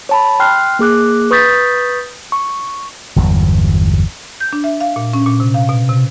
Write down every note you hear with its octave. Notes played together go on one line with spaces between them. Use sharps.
C#5 A5 B5
G5 C6 F6 F#6 C7
A#3 G#4 D6 F#6
B4 C#6 D#6 G6 A6 B6
C#6
G1 E2 F#3
G6
D4
E5
F5
A#2
C#4
A#2
C3
F5
B2
C3